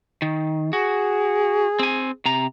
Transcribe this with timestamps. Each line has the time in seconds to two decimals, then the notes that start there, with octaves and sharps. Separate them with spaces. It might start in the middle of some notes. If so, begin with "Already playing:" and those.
0.22 D#3
0.73 F#4 G#4
1.79 C4 G#5
2.25 C3 A#5